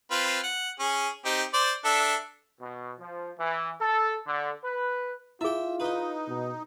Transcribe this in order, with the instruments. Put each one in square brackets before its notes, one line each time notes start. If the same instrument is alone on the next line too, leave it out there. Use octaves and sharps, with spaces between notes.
[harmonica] C4 F4 B4
F#5
C#4 G#4
C4 D#4 G4
C5 D5
D4 A4 E5
[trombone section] B2
F3
E3
A4
D3
B4
[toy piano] E4 G#4 [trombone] F4 [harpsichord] E5 G5
[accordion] D#4 [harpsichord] B4 D#5
[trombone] B2